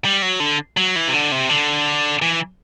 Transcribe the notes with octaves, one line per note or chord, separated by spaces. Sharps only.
G3
F#3
D3
F#3
E3
C3
D3
C3
D3
E3